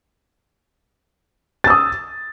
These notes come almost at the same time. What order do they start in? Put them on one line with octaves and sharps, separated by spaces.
A6 E6 D#6